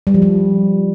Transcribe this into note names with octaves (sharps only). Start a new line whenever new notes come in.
G3
F3
G3